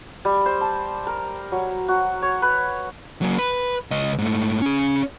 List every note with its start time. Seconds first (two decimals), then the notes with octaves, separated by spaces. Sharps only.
0.25 G3
0.46 C5
0.61 A5
1.07 A#4
1.52 F#3
1.88 F#4
2.22 C#5
2.42 B4
3.22 F#3 A#3
3.39 B4
3.91 C#2 D#5
4.18 G#2 A3
4.62 C#4 G#4